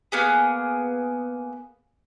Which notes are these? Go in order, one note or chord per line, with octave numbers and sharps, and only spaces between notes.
A#3 B3 G#4